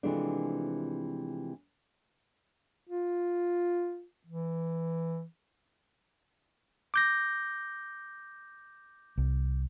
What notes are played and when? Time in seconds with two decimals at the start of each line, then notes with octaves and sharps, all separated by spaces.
0.03 C3 E3 F3 G#3 A3 D4
2.88 F4
4.27 E3
6.94 D6 G6 A#6
9.18 C2